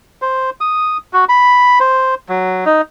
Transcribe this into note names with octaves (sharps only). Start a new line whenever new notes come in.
C5
D#6
F#4
B5
C5
F#3
D#4